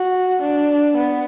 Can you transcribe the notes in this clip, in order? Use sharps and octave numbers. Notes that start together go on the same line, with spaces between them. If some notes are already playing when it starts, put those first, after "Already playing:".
Already playing: F#4
D4
B3